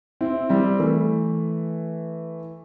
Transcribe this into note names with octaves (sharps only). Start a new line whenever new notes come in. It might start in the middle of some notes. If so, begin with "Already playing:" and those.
C4 E4
G3 C4
E3 A3